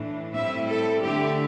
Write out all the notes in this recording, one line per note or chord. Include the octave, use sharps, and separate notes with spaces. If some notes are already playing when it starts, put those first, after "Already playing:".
Already playing: A2 E3 A3 D4
A2 G3 C4 E4 E5
A4
D3 A3 E4 G4